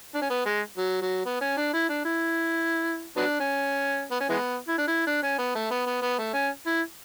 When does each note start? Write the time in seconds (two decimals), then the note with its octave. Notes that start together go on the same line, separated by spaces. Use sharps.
0.15 D4
0.22 C#4
0.30 B3
0.46 G#3
0.77 F#3
1.01 F#3
1.26 B3
1.41 C#4
1.57 D4
1.73 E4
1.89 D4
2.05 E4
3.16 F#3 B3 D4
3.40 C#4
4.11 B3
4.21 C#4
4.29 E3 G#3 B3
4.68 E4
4.78 D4
4.87 E4
5.07 D4
5.23 C#4
5.38 B3
5.55 A3
5.71 B3
5.86 B3
6.02 B3
6.19 A3
6.34 C#4
6.66 E4